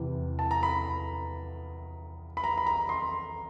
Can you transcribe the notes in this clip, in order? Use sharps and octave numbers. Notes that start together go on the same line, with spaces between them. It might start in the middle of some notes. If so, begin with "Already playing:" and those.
Already playing: E2 C3 E3
A5
A#5
B5
B5
A#5
B5
A#5
C6